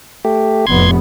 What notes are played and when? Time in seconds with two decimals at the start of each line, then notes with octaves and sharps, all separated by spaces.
0.25 A3 G4
0.67 F1 A2 B3 C6 G#6